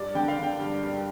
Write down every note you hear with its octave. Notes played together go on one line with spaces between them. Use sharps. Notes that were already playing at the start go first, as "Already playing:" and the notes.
Already playing: G2 D5
D3 G5
F5
D3 G5
G2
G2